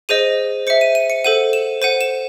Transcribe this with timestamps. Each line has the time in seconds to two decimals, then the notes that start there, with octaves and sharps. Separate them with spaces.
0.09 G#4 C5 D#5 D#7
0.67 C5 E5 C#7
0.81 D#7
0.95 D#7
1.10 C#7
1.24 A4 C5 F#5 D#7
1.53 E7
1.82 C5 F#5 D#7
2.01 E7